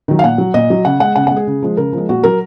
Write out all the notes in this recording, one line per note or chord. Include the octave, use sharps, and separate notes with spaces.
D#3 F#3
F5
A#2 F#5
F#3
A#2 D#5
F#3
C#3 F#5
G#3 F#5
C#3 F#5
G#3 F#5
G#4
C#3
F3 G#3
C#3 A#4
F3 G#3
A#2 F#4
F#3 A#4